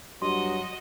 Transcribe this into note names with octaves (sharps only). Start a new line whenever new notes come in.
G2 F#3 F#4 D#5 C6